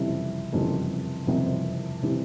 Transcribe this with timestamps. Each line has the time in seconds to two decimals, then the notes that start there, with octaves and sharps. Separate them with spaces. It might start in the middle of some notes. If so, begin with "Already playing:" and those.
Already playing: F#1 F2 C3 E3 G3 E4
0.53 F#1 F2 C3 E3 G3
1.27 F#1 F2 C3 E3 G3 E4
2.02 C3 E3 G3